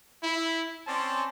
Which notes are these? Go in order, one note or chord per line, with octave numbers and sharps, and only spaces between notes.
E4
C4 C#4 D5 A5 C6